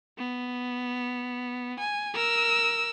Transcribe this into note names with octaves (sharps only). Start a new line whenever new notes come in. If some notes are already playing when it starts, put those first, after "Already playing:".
B3
G#5
A#4 E6